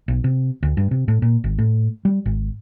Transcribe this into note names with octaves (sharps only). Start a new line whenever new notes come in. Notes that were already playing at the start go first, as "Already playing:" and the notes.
B1
C3
D2
G2
C3
A2
A#2
G#1
A2
G3
G#1